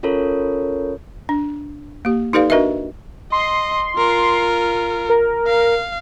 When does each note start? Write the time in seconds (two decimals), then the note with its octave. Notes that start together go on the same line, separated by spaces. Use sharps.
0.03 C#4 F4 A4 A#4 C#5
1.29 D4
2.05 A#3 G4
2.33 D#4 G4 A4 B4 D5 F5
2.50 D4 F#4 A#4 B4 D#5 E5
3.32 D#5 C6
3.98 F4 A#4
5.09 A#4
5.47 F5